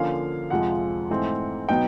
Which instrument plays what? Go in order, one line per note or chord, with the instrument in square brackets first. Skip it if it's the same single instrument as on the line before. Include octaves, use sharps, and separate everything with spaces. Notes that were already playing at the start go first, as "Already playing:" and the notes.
Already playing: [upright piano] D3 F3 A#3 C#4 F5
F2 C3 F3 G#3 F#5
G#2 E3 A3 C4 D#4
B2 F#3 B3 D#4 G5